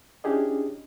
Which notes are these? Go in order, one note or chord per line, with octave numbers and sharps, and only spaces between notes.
C#4 D4 E4 G4 G#4 D#5